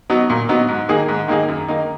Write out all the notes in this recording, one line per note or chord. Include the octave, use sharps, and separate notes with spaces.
F#3 B3 D#4
A#2
F#3 B3 D#4
G#2
D#3 A#3 D#4 G#4
G#2
D#3 A#3 D#4 G#4
F#2
D#3 A#3 D#4